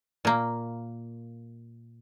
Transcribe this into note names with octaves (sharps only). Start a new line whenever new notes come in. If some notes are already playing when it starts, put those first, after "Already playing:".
A#2 A#3